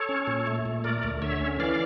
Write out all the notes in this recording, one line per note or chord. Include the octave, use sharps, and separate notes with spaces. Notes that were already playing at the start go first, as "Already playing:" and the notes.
Already playing: A4 C#5
C#4
A#2
A3
A#2
A3 A#4 D5
D2
D3 C#5 E5
C#4
E3 D5 F5